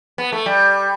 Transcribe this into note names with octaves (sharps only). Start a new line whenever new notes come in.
B3
A3
G3